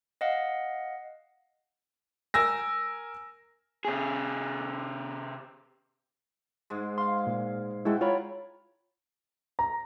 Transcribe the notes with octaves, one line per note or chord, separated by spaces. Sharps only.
D#5 F5 F#5
A#4 G#5 E6 A#6
C3 G#4
G#2 G#3
F5 C6
A#2
G#3 E4 F#4 A4 G5
F4 A#4 C#5 B5
A#5